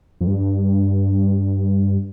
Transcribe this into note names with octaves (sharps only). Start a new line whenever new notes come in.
F2
G2